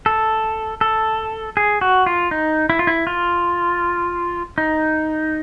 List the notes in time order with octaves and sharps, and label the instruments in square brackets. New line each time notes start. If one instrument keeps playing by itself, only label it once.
[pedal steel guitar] A4
A4
G#4
F#4
F4
D#4
E4
F4
E4
F4
D#4